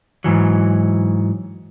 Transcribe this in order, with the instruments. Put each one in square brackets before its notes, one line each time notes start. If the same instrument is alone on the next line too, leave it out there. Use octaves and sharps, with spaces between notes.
[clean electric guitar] G#2 E3 F#3